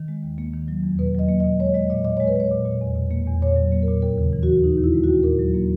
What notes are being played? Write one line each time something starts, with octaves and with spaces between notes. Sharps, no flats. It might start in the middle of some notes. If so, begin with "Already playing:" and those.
Already playing: D#3
G#3
D#2
A#3
D#3
F#3
E2
B2 B4
F#3 D#5
A#3
D#5
B2
G#3 C#5
G#3 D#5
A#2 D#5
A#2 D#5
G#3 C#5
B4
G#3 C#5
A#2
A#2
E2
B2
A#3
E2
A#2 C#5
F#3
A#3
A#4
A#2
D#2 A#4
C#3
E3
F#4
D#2
D#2 D#4
D#3
E4
G#3
F#4
D#2
A#2 A#4
F#3
A#3